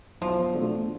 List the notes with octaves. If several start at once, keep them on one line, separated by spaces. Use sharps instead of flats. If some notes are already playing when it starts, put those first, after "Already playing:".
B1 F3
B2 A3 D4